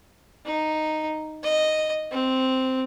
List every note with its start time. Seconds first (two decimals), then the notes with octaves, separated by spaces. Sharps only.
0.46 D#4
1.43 D#5
2.12 C4